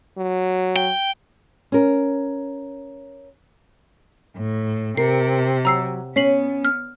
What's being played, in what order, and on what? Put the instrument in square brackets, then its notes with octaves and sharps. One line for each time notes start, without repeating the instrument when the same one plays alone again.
[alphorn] F#3
[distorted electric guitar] G5
[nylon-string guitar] C#4 A#4
[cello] A2
[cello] C3 [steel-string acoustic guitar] A#4 [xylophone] C7
[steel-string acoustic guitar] F#3 [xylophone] A#5 E6 C7
[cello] B3 [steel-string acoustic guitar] C#4 [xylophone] B6 C7 F#7
[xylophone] F6